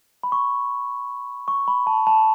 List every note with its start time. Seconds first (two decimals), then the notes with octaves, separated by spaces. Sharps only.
0.23 B5
0.32 C#6
1.48 C#6
1.68 B5
1.87 A5
2.07 A5